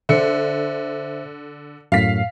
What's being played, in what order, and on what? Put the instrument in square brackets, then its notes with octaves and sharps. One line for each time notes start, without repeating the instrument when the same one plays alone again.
[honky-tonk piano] D3 C#7 [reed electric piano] C5 E5
[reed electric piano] F#2 A2 [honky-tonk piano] F5 B6